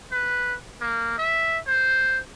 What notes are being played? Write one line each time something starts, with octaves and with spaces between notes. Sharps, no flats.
B4
A#3
E5
C5